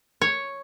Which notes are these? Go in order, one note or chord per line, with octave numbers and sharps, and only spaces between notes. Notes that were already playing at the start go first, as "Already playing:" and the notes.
C#5